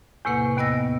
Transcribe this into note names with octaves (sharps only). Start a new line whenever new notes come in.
E2 A2 C3 A#3 B4 F#5
D#2 B3 D#5 E6 A#6